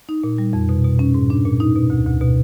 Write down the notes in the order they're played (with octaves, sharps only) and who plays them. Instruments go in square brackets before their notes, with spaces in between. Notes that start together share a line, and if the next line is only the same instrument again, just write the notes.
[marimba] D#4
A#2
G3
F2
B2
B2
C#4
G#2
D4
A#2
D#4
B2
D2
D2
B2